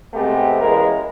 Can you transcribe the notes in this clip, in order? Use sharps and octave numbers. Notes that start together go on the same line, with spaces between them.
C3 G#3 A3 B3 C4 G4
A1 E3 G#3 A#3 A#4 B4